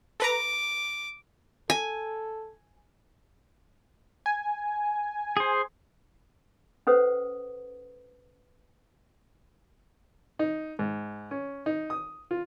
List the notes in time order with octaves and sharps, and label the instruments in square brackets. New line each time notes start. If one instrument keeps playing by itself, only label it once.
[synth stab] A4 B4 A#5 [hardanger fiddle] D6
[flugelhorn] A4 [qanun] G#5
[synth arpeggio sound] G#5
[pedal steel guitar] G#4 C5
[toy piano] C#4 A4 B4 C5 F#5 D#6
[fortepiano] D#4
G#2
C#4
D#4
D#6
F4